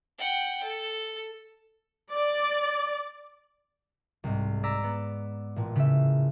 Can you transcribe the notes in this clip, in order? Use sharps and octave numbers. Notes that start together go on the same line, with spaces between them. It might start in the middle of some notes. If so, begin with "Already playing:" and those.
F#5 G5
A4
D5
C2 G#2
D5 A#5 E6 B6
B3
A1 A#2
C#3 E5